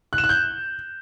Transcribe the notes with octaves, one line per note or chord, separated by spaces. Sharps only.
F#6
E7
F#6
G6